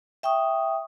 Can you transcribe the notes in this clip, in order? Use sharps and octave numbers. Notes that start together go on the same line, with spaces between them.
E5 G5 C#6 D#6